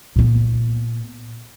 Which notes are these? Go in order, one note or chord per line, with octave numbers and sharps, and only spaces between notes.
A#2 B3